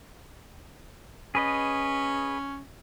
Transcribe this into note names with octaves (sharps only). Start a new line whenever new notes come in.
C#4 G#4 B4 D#5